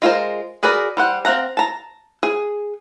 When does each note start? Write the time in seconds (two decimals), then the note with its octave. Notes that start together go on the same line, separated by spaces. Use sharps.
0.02 G#3 F4 A#4 C5
0.63 F#4 G#4 A#4 B4 D5
0.97 G3 C5 F#5
1.25 C4 F5 F#5 A#5
1.57 A5 A#5
2.23 G#4